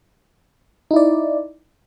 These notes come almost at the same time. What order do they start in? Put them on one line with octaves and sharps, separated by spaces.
D#4 E4 D5